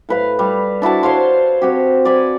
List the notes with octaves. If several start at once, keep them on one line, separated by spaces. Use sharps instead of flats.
A2 B4 F5
G3
D4 E4 F#4 A5
C5 C#5 F5 C6
C4 F#4 G4
D5 G#5 B5